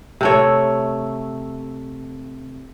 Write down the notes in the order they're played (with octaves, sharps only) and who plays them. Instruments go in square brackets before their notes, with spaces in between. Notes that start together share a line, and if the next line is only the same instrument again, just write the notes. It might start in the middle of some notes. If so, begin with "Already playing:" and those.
[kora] C3 A3 C#5